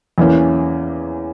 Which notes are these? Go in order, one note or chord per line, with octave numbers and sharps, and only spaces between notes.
E2 E3 A#3 C#4